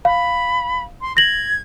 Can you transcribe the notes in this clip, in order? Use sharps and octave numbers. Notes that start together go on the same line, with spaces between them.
F5 B5
C6
G#6 A#6 F#7